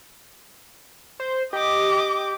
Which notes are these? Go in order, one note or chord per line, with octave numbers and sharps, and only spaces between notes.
C5
G4 D#5 D6